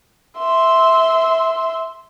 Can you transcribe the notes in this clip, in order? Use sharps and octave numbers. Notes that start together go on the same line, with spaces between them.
E5 C6